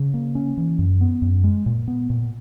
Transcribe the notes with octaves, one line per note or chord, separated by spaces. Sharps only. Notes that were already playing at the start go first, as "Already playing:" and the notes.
Already playing: C#3
A#3
C#4
E3
F#2
B3
F#2
G#3
A#2
B3
A#2